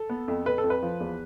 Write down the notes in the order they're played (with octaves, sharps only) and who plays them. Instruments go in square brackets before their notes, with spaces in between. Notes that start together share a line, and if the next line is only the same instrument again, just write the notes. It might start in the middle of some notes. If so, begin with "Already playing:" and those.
Already playing: [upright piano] A4
B3
F2
F2 B4
A4
F2
B4
F3
E2